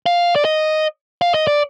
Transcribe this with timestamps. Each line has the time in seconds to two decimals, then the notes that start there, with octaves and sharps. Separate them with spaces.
0.06 F5
0.36 D5
0.45 D#5
1.22 F5
1.34 D#5
1.47 D5